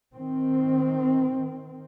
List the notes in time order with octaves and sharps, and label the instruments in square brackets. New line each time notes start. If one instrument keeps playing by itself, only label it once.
[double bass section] D#3 C4